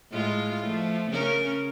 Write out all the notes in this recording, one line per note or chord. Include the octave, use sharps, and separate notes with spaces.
A2 G#3 F4
F3 A3
C#3 C#4 A#4